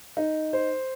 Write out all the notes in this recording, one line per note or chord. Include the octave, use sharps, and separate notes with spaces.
D#4
C5